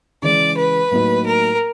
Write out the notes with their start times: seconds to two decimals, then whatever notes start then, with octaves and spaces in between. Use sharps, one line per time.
0.22 C#3 E3 G#3 D5
0.57 B4
0.91 A2 F#3 A#3 D#4
1.25 A#4